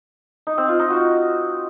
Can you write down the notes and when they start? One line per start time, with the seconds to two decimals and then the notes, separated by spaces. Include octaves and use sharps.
0.47 D#4
0.58 C4
0.69 F4
0.79 D#4
0.90 F#4